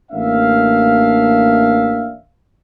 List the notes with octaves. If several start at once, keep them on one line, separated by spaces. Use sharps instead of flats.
A1 A#3 D4 E5 F5